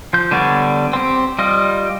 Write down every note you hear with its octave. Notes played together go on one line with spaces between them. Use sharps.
F3 G6
D3 G3 B3 C#5 D5
C4 G4
G3 F4 D#5